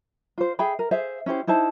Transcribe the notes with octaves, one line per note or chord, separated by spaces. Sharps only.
F4 C5
G#4 E5 G5 B5
A#4
G#4 C5 E5 F5
C#4 E4 G4 C5
D#4 E4 C5 A5